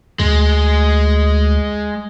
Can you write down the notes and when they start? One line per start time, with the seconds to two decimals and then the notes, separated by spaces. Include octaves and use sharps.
0.20 D2 G#3